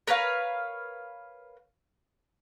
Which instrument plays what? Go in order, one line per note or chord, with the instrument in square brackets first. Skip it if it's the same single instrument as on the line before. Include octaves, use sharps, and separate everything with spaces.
[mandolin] A#4 B4 C#5 F5